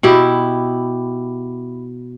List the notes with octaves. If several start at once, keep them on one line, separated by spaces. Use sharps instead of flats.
B2 E4 G4